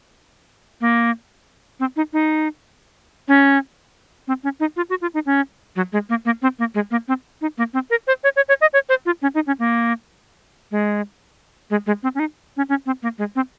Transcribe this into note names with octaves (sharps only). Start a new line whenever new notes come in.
A#3
C4
D#4
D#4
C#4
C4
C#4
D#4
F4
F#4
F4
D#4
C#4
F#3
G#3
A#3
A#3
C4
A#3
G#3
A#3
C4
D#4
A#3
C4
A#4
C5
C#5
C#5
C#5
D#5
C#5
C5
F4
C#4
D#4
C#4
A#3
G#3
G#3
G#3
C4
C#4
D#4
C#4
C#4
C4
A#3
G#3
C4